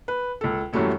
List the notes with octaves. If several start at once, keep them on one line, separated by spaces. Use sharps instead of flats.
B4
C#2 A4
F#2 E3 F#3 G3 A3 C#4